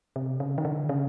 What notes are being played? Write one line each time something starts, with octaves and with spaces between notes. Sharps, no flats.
C3
C#3
D#3
D3
C#3